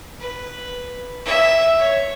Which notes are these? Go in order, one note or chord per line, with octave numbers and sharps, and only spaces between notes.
B4
E5
C#5